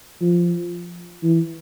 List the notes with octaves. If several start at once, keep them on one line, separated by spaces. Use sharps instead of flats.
F3
E3